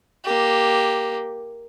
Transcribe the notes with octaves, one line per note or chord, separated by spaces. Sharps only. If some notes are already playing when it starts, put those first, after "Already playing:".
A#3 G4